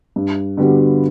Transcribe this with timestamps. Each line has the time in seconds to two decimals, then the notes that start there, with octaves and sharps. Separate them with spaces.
0.16 G2
0.57 D3 G3 B3 F#4